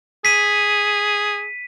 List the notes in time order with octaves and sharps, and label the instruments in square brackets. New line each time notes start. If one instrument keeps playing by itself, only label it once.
[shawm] G#4 [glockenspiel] B6 D#7